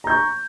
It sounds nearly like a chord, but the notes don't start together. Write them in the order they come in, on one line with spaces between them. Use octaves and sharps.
A#5 G6 C#6